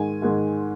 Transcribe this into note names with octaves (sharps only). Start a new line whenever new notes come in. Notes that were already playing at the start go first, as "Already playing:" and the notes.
Already playing: G#2 D#3 G#3 G#5
G#2 D#3 G#3